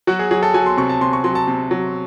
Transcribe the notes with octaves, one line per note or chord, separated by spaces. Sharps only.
F#3 F#4
G#4
F#3 G#4
A4
F#3 G#5
C6
C3 C#6
A5
C3 C6
C#6
F#3 C6
A5
C3
F#3